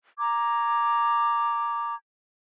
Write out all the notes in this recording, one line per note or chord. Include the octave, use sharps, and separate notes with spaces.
A#5 D6 G#6